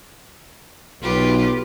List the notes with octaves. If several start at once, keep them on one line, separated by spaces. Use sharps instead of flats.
B1 F4 G4 B4